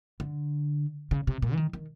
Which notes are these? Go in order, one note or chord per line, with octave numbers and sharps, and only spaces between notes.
D3
C#3
C3
A#2
E3
D#3
D#3